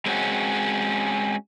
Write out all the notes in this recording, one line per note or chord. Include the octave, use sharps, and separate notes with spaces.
G#3 C4 C#4 F#4